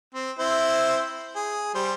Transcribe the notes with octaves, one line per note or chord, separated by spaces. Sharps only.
C4
C4 E4 C5
G#4
G3 G4 C5